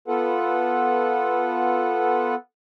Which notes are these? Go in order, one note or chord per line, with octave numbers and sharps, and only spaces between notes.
B3 F4 A4 B4 F#5